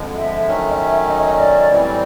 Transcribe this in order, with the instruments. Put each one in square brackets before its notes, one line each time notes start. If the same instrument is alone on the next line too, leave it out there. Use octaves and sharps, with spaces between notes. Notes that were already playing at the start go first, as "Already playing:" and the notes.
Already playing: [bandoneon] F2 D3 F3 G#3
[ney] E5
[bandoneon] D#3 F#3 A3 C#4
[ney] D#5
E5
D#5
D#5
D5
[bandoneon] A2 E3 G3 C4